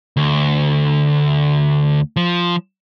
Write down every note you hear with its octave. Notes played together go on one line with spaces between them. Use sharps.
D2
F3